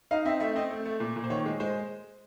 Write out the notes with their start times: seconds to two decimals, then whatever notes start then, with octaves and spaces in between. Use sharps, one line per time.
0.11 D#4 F5
0.25 C4 E5
0.40 A3 E5
0.55 C4 D#5
0.71 A3
0.86 A3
1.00 A#2
1.16 A#2
1.24 C5
1.30 D#3 C#5
1.46 G#3
1.60 G#3 C5